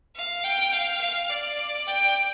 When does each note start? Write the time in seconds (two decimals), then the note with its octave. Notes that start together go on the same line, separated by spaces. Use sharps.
0.16 F5
0.44 G5
0.73 F5
1.01 F5
1.30 D5
1.87 G5